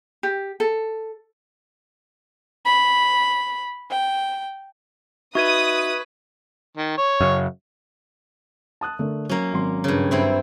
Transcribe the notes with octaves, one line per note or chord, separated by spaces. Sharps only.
G4
A4
B5
G5
D#4 F#4 B4 E5 C#6 D#6 G#6 D#7
D#3
C#5
F#2 C#3
A5 D#6 F#6
D3 A3 A#4
F#3 A#3 C#4
G#1 F#3 C6
G2 C#3
G2 C4 E4